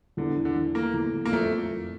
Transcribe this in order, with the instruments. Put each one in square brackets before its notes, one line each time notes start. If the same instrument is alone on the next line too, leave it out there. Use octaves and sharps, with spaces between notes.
[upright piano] E2 [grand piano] D3
[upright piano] E3
[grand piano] D3
[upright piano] E3
[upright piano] A3 [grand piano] A#3
[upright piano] E2
E2
[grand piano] A#3
[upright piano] F2 [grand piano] A3
[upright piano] F2
F2